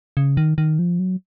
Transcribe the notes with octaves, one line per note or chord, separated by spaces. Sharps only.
C#3
D#3
D#3
F3
F#3